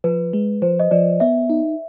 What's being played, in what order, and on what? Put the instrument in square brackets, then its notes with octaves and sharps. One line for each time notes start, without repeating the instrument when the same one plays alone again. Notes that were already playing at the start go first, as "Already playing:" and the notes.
[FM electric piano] F3 [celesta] B4
[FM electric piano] G#3
[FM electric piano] F3 [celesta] C5
[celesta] D#5
[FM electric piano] F3 [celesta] D5
[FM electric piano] B3 [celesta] E5
[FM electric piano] D#4